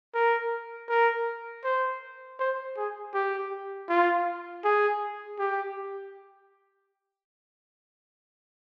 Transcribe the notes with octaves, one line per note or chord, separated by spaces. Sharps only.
A#4
A#4
C5
C5
G#4
G4
F4
G#4
G4